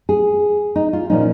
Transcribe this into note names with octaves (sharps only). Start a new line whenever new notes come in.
G#4
D#4
F4
A#2 F3 C#4 D#4